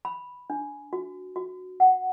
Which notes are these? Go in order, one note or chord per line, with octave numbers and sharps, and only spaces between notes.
B5
D4
F#4
F#4
F#5